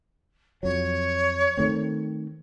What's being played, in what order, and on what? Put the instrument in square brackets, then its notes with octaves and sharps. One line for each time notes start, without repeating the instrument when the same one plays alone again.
[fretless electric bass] F2 F#3 [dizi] C#5
[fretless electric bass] D#3 A3 C4